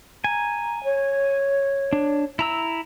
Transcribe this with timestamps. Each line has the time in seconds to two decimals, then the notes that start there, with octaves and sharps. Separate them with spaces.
0.24 G#5 A#5
0.84 C#5
1.93 D4
2.39 E4 A#5 E6